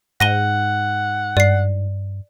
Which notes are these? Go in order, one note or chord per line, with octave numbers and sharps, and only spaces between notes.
G#2 F#5 A#6 D#7 G7
G2 D5 C7